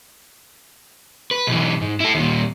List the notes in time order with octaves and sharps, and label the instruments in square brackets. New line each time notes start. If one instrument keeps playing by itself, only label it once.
[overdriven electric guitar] B4
B1 E3
G#2
E4 A4
D#2 A#2